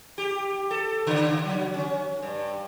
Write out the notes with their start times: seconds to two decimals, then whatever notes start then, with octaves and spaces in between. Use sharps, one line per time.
0.18 G4
0.71 A4
1.07 C#3
1.45 F#3
1.74 C#4
2.22 G2